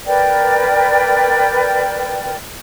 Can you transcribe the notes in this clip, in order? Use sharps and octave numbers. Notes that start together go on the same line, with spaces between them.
A#4 B4 D5 G5